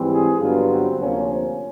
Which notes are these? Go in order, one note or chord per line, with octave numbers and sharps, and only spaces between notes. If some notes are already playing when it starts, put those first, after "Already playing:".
Already playing: G#2 E3 G3 C4
G#4
G2 D3 F#3 B3 F4
C4
D2 C3 F3 A#3 C#4
C#4